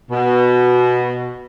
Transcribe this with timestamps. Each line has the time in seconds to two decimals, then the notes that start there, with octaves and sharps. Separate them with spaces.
0.11 B2